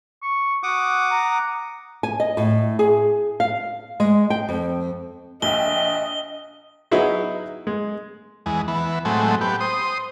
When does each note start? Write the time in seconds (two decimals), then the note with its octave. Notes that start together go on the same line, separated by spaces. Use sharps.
0.22 C#6
0.63 F#4 F#5 D6 D#6
1.11 A#5
2.03 G#5
2.20 D#5
2.37 A2
2.79 G#4
3.40 F5
4.00 G#3
4.30 G5
4.49 F2
5.42 A#1 D#5 E5 G5 G7
6.91 F#3 B3 D#4 E4 F#4 G#4
7.67 G#3
8.46 E2 G#3
8.68 E3 B3
9.05 A2 F#3 G#3 A3 C4
9.41 B3 G4
9.60 C5 D#6